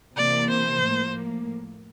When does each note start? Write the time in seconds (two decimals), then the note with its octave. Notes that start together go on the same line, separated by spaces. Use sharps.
0.16 C3 E3 A#3 D5
0.50 C5
0.83 A2 F3 A#3